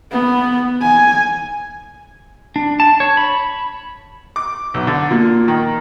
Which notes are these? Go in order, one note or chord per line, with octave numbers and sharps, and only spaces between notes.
B3
G#5
D4
A5
C#5
B5
D6
B1
D3
A#2
D#3